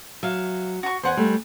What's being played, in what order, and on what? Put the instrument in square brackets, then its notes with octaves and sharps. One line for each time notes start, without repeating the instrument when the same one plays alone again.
[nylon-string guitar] F#3 [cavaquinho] E5 F5
[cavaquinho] F#4 C#6
[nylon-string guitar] E2 [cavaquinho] C5 F#5 G#5
[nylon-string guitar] G3 A3